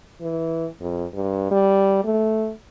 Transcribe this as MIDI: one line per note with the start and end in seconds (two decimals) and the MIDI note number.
0.21 0.67 52
0.81 1.05 41
1.14 1.49 43
1.51 2.02 55
2.05 2.52 57